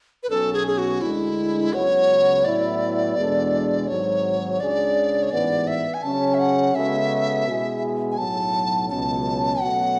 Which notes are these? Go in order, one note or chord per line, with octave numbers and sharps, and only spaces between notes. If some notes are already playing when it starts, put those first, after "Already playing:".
B4
B1 B2 F#3 C#4 A4
G#4
G#4
F#4
D2 D3 G#3 E4
C#2 C#3 F#3 B3 F#4 C#5
A2 F#3 B3 E4 D5
E2 B2 G#3 D4 A4
G#1 G#2 F#3 C#5
C#2 C#3 G#3 D4 G#4 D5
C#5
A1 G#2 E3 B3 D5
E5
G#5
C#3 F#3 C#4 G#4 A5
E5
F#5
C#3 G#3 B3 F#4 A4 E5
B2 G#3 B3 E4 G#4
G#5
B1 A2 F#3 A5
C#2 B2 F#3 C#4 A5
B2 F#3 A3 C#4 F#5